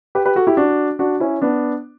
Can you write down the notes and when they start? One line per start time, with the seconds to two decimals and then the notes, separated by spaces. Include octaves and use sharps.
0.15 G4 B4
0.25 G4 B4
0.36 F#4 A4
0.47 E4 G4
0.57 D4 F#4
0.99 D4 F#4
1.20 C#4 E4
1.42 B3 D4